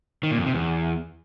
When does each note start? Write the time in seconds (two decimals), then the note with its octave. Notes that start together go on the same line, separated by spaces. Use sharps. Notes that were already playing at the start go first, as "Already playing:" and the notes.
0.23 D#3
0.31 A#2
0.38 F2
0.46 C3
0.53 E2